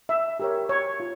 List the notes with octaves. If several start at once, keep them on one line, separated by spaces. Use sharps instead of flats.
E5
G4 A#4 C#5
C#5
F4